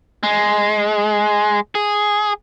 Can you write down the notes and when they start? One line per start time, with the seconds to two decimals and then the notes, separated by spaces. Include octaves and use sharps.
0.23 G#3
1.75 G#4